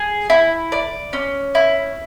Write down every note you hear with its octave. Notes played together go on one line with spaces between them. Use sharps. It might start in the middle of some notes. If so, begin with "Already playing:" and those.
Already playing: G#4
E4
D5
C#4
E4